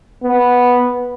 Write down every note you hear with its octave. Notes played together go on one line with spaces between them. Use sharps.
B3